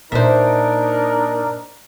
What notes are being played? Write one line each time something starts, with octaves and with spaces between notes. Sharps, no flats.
A#2 D4 D#4 A#4 C5 E5